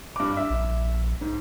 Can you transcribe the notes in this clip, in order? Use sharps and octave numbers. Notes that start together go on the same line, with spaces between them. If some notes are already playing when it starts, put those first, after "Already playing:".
G2 D6
E5
A#1
G#2